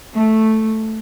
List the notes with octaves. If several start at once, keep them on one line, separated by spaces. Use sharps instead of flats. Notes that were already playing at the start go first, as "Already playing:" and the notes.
A3